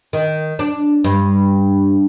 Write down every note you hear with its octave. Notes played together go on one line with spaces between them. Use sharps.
D#3
D4
G2